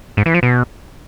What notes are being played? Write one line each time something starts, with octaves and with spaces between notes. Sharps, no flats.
G#2
E3
F3
B2